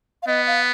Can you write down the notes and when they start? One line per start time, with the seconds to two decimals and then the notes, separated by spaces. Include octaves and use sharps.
0.23 F5
0.27 B3 D#5
0.47 F5